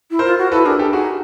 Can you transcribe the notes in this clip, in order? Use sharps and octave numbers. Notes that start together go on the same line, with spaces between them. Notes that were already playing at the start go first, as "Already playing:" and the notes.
E4
A#4 C5
F4
F#4
E4 A4 B4
D4 G#4 A#4
G4 A4
D#4 F#4 G#4